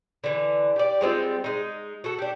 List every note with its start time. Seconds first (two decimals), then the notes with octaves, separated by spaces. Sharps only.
0.24 D3 E3
0.76 G4 D5
1.01 G3 G#3 C4 F4
1.44 G#3 D#4
2.04 F#4 A4
2.18 D4 G4